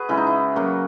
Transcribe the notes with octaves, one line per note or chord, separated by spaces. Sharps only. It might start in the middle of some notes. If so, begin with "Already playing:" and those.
Already playing: F#4 G#4 B4
C#3 G#3 E4
D#4
E4
C#3 F#3 A#3 F#4